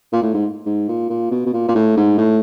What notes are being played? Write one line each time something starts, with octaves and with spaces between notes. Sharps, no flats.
A#2
A2
G#2
G#2
A#2
A#2
B2
B2
A#2
A#2
A2
G#2
A2